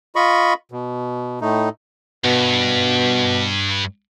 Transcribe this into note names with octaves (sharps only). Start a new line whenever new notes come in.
F4 D#5 B5 C#6
B2
A2 A3 D#4
G2 B2